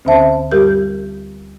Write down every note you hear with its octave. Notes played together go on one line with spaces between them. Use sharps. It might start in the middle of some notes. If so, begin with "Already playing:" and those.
D2 D3 C#4 C5 E5 A5
G2 G3 G4 A#4 G6